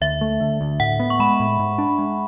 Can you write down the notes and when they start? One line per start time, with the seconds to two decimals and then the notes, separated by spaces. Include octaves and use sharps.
0.01 D2 E5
0.21 A3
0.40 D3
0.61 D2
0.80 A2 F#5
1.00 B3
1.10 C#6
1.19 G#3 B5
1.40 A2
1.59 G#2
1.78 D4
1.98 G#3